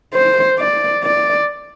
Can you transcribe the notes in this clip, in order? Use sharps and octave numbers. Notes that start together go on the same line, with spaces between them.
C5
D5
D5